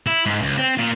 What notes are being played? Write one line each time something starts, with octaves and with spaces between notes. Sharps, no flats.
E4
G#2
C#2
C4
A#2